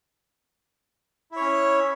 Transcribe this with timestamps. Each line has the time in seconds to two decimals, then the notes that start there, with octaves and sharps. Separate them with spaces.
1.32 E4
1.36 C#5
1.41 C#4